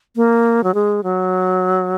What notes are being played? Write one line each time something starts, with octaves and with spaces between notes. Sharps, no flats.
A#3
F#3
G#3
F#3